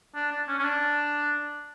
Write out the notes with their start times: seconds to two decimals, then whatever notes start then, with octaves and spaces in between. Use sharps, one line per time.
0.15 D4
0.31 D4
0.48 C#4
0.59 C#4
0.64 D4